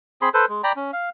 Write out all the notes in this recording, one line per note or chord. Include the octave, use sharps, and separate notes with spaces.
C4 G#4 B5 C6
A4 B4 C5
G#3
D5 G5 A#5 B5
C#4
F5